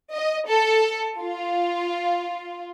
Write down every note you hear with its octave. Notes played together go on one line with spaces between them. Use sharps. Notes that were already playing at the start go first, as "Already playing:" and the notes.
D#5
A4
F4